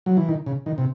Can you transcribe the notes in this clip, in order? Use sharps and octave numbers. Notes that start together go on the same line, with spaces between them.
F#3
E3
D#3
C#3
D#3
C3